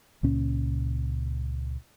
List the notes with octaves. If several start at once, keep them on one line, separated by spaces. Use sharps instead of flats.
C#2 A#2 C#4